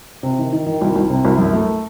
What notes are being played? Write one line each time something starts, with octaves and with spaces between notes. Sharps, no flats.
C3
D#3
D#3
D#3
C2
C2
C3
C2
F#2
A3